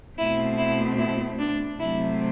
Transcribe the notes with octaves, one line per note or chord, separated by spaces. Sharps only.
B2 A3 C4 E4
E4
E4
D4
C3 F#3 A3 C4 E4